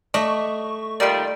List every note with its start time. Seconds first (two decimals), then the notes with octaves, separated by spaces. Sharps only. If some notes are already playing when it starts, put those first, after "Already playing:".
0.14 A3 D5 D#5 C#6
1.00 D#3 G3 A#3 F4 D5